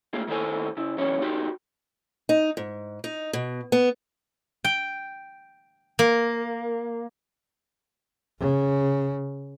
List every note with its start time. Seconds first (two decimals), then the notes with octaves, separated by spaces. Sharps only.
0.13 A3 A#3 F4 G#4
0.28 A2 D#3 E4 A4 C5 G#5
0.77 C#3 E4
0.98 C3 E3 F#3 C#4 C#5
1.22 C3 D#4 F#4 G4
2.29 D#4
2.57 G#2
3.04 D#4
3.33 B2
3.72 B3
4.64 G5
5.99 A#3
8.40 C#3